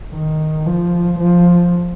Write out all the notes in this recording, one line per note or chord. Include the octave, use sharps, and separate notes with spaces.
D#3
F3
F3